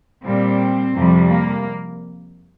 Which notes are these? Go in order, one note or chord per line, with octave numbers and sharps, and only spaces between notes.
A#2 G3 C4
F2 C3 G3
A#3